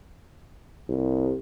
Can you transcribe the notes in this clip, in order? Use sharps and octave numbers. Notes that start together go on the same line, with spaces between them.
C2